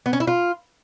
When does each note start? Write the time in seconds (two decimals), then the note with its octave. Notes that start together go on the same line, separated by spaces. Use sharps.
0.06 B3
0.13 C#4
0.20 E4
0.27 F4